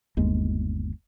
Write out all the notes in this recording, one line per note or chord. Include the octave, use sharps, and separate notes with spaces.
G1 D#2 G#3